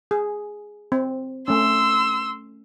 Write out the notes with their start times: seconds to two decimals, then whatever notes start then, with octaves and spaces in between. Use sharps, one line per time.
0.11 G#4
0.92 C4
1.48 A3 C#4 C6 E6